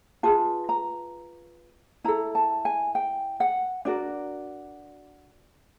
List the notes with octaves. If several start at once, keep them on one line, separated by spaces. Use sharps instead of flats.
F4 G#4 B4 A5
A#5
E4 A4 A#5
A5
G#5
G5
F#5
D4 F#4 A#4 D5